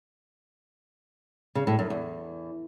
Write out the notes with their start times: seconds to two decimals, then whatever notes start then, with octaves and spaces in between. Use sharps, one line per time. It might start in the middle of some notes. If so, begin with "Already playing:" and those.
1.55 C#3
1.67 A2
1.79 F#2
1.90 E2